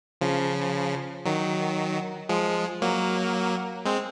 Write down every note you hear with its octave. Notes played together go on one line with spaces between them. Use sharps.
C#3 F3
D#3 F#3
F3 G#3
F#3 A#3
G#3 C4